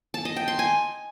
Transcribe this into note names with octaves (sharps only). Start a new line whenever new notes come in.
A5
D#5
G5
C6
G#5